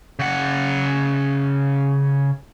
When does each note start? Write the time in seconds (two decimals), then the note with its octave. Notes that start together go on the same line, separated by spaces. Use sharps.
0.19 C#3 F#5